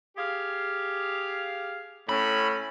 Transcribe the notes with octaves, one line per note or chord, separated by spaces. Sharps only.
G4 G#4 F5
A2 A3 C#4 B5